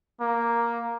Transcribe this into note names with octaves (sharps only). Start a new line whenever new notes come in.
A#3